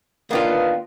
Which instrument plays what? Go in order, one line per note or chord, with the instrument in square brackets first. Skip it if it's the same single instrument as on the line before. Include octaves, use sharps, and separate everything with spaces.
[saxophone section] D#3 B3 [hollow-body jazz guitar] A#3 D4 F4